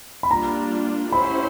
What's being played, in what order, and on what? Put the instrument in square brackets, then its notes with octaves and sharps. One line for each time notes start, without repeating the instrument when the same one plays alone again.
[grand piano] B5
[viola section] G3 A#3 D4 F4 [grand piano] A#5
[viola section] C#4 E4 G4 C5 [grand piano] B5